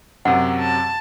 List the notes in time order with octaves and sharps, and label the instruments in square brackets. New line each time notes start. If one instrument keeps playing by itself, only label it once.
[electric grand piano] F#2 C3 F#3 [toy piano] F#5
[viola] A5